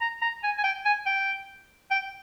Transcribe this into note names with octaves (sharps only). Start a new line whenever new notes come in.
A#5
A#5
G#5
G#5
G5
G#5
G5
G5